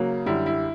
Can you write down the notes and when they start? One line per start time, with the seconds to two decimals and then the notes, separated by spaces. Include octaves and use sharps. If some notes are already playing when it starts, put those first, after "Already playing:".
Already playing: C#3 F#3 A#3
0.26 F#2 D3 G3 E4
0.46 E4